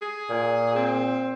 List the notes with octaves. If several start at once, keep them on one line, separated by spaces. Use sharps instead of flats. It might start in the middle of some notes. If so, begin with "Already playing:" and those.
G#4
A#2
C4